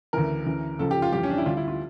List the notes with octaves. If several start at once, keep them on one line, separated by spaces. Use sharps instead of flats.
D2 C#3 E3 A#4
D2 C#3 E3
C#2 C#3 F3 A4
G4
F4
F2 E3 G3 G4
C#4
D4
E4
D2 D3 G3 F4
E4
F4